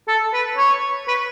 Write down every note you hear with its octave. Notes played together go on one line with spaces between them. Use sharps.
A4
B4
C#5
B4